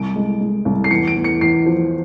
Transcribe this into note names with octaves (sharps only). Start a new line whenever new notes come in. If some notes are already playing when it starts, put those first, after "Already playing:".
Already playing: C2 D7
G#3
G#3
C2
C7
E2 C#7
D7
E2
C#7
E2 C7
F3